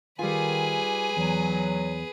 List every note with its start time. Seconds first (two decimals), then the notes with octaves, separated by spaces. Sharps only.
0.19 D#3 G3 F4 G#4 B4 G#5
1.17 E2 F#3